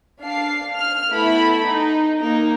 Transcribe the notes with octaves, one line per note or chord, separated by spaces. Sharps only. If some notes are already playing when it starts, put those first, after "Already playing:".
D4 F5 C7
F6
A3 B3 E4 B5
D#4
A#3 D#4